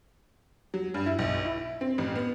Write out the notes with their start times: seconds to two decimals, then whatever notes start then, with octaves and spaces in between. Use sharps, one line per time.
0.74 F#3
0.94 G2
1.06 E4
1.19 B1
1.45 E4
1.81 C4
1.98 A1
2.16 B3